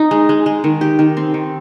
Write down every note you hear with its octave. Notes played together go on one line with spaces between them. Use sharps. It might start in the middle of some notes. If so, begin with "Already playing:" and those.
Already playing: D#4
G#3
G#3
G#3
D#3
G4
D#3
C4
D#3